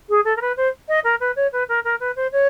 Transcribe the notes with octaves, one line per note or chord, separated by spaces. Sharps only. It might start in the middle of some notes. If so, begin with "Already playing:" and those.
G#4
A4
A#4
B4
C5
D#5
A#4
B4
C#5
B4
A#4
A#4
B4
C5
C#5